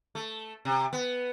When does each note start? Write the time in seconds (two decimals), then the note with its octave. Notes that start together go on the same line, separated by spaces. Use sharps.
0.15 A3
0.65 C3
0.93 B3